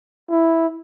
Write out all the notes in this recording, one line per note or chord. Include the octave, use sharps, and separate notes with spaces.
E4